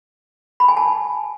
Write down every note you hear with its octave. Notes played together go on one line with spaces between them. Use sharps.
B5
G#5
A5
G#5